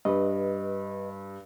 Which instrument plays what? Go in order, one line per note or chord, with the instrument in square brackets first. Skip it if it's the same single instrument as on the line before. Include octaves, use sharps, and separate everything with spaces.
[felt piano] G2 [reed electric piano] B4 D#5